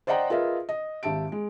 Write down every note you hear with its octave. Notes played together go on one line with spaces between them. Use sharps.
C5 D5 D#5 F#5 G5 A#5
F4 G#4 A#4 B4 D#5 E5
D#5
G#1 G4 E5 A5 D7
G#3